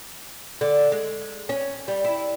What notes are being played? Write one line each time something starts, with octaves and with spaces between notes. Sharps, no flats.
D3
G#3
C#4
G3
E4